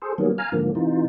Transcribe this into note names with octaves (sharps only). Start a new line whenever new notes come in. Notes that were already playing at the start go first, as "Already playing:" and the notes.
G#4 A4 C5
D#3 F#3 G3 A#3 B3 C#4
F5 G#5 A#5 F6
G#2 D3 F3 A#3
C3 E3 D#4 F4